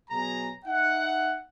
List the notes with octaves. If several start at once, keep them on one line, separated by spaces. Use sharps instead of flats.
B2 F#3 G#4 A#5
D#4 E5 F#5